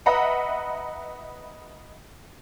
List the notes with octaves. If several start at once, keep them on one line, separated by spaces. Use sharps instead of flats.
B4 D#5 E5 F#5 A#5 B5